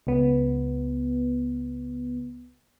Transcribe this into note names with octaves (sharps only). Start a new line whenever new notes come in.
C#2 B3